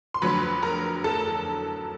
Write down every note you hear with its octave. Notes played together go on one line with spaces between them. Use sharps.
C6
F2 D3 F#3 B4 B5
A#4 A#5
A4 A5